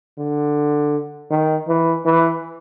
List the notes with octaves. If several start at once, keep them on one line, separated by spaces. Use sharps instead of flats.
D3
D#3
E3
E3